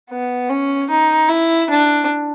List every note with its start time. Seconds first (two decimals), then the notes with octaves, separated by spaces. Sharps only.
0.10 B3
0.50 C#4
0.90 D#4
1.29 E4
1.70 D4